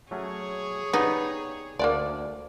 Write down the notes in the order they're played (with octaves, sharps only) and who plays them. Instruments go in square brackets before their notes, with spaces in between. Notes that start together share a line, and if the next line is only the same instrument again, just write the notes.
[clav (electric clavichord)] F#3 A3 C#4 [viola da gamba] G#4 C#5
[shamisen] B3 [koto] D#4 [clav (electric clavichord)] G4 D5
[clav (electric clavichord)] D2 [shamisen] A#3 D4 D5